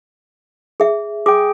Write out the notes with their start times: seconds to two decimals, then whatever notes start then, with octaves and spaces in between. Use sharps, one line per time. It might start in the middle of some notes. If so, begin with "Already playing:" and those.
0.80 G#4 E5
1.26 G#4 G5 D6